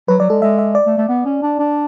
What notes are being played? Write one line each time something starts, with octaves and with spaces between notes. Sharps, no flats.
F#3 B4
F#3 D5
G#3 A4
G#3 E5
E5
D5
A3
A3
B3
C#4
D4
D4